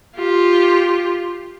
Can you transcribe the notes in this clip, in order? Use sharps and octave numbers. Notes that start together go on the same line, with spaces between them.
F4 G4